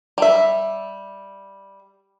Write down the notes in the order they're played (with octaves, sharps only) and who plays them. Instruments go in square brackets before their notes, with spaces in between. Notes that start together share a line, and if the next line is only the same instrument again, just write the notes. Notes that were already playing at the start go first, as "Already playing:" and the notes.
[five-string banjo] G3 E5